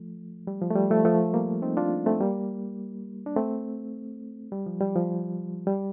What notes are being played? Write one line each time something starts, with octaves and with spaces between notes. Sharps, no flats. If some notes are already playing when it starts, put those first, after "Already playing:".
Already playing: F3 A3
G3
F3
A3
G3
F3 A3
F3 A3
G3 A#3
C4 D#4
D4 F4
A3 C4
G3 A#3
D4
A3 C4
G3
F3
G3
F3
G3